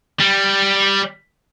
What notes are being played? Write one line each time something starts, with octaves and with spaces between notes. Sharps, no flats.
G3